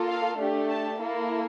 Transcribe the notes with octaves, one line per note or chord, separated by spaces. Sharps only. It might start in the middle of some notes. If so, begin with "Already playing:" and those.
Already playing: A#3 F4 A4
F5
A3 D4 G4
A5
A#3 E4 A4